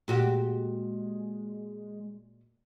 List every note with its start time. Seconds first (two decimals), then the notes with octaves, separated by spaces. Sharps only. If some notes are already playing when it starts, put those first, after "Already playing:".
0.08 A#2 G#3 F#4 G4